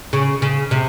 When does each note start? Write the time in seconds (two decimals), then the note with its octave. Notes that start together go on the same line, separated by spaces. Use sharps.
0.13 C#3
0.42 C#3
0.71 C3